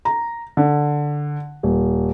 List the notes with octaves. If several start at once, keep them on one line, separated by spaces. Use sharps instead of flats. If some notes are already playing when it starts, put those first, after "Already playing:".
A#5
D3
D#1